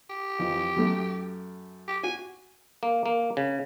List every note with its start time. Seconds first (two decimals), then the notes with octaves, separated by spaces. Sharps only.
0.10 G4
0.39 F2 E3
0.76 F#2 A3
1.88 G4
2.03 F#4 G#5
2.83 A#3
3.06 A#3
3.37 C#3